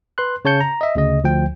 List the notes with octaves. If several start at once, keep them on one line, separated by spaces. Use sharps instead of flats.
B4 C6 F#6
C#3 C#5 A5 G6 C#7
A#5
D#5 E5
D2 C#3 D#5
D2 F3 G5